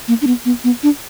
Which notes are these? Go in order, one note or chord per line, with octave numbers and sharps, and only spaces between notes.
A#3
D4
B3
B3
B3
D4